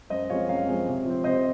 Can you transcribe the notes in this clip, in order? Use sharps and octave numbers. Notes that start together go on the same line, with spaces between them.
F#2 C5 D#5
F3 G#3 C4 C#5 F5
F#2 C#5 F5
F3 G#3 C4
C3
F3 C4
C3 C5 D#5